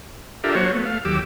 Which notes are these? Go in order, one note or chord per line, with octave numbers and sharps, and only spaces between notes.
D4 F4 G4 A4 A#4 E5
F#3 A#3 F#4 C5 C#5
A3 B3
A3 F5
D#2 F#3 G4 D6 E6